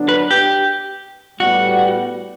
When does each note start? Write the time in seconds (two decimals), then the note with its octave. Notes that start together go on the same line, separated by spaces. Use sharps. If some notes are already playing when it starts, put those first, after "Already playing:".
Already playing: D3 F#3 B3 D4
0.09 B4
0.31 G4
1.40 A2 G3 B3 F#4